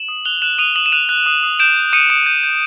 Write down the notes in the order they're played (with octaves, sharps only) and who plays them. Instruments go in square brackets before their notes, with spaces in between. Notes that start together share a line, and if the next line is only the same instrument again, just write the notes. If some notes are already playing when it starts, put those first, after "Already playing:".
Already playing: [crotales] E7 F#7
D#6
F#6 F7 G7
F#6 E7 F#7
D#6 D#7 F7
D#6 E7 F#7
E7
F#6 D#7 F7
F#6
D#6
D#6
G6 D7 E7
G6
D#6 C#7 D#7
D#6 D7 E7
G6
G6